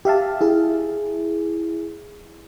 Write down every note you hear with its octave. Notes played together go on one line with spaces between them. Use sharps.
G4 E5 F5 A5
E4 G#4